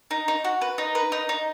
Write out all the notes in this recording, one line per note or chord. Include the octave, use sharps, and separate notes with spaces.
D#4
D#4
F#4
B4
D#4
B4
D#4
D#4